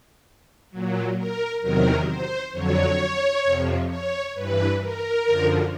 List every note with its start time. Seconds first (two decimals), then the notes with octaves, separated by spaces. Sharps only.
0.70 A#2 F#3
1.17 A#4
1.61 E2 C3 D#3 F#3 A#4
2.07 C5
2.52 F2 D3 F#3 C#5
3.44 F2 C3 F3
3.89 C#5
4.34 G2 E3 B4
4.80 A#4
5.25 F#2 D3 F3